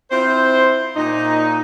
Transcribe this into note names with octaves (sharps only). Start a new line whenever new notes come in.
C4 E4 F4 C5
A#2 D#4